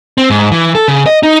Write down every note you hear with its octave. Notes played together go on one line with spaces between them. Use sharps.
C4
G#2
E3
A4
C#3
D#5
D#4